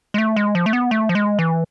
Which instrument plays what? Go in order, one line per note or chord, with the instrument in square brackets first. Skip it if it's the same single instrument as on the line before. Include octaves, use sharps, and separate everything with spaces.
[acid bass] G#3
A3
G#3
F3
A3
B3
A3
F3
G#3
E3